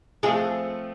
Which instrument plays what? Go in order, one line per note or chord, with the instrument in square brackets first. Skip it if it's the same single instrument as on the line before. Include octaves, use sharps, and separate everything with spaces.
[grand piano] F3 A3 C4 F4 A4 [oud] G#3 G#4